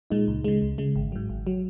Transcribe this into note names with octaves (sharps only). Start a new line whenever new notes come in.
A#2 G#3 D#4
C#2
C#3 G#3
C#2
C#3 G#3
G#1
G#2 F#3
G#1
F#3